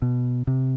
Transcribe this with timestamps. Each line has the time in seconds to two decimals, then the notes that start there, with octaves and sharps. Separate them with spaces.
0.02 B2
0.47 C3